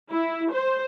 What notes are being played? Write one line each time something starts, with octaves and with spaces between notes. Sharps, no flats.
E4
C5